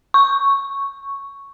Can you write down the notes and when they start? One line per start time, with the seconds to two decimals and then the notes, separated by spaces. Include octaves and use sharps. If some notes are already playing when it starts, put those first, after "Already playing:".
0.14 C#6